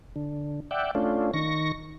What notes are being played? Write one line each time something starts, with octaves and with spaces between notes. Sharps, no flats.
D3
D5 E5 F#5 G5
A3 C#4 D4 F4
D#3 C#6 A#6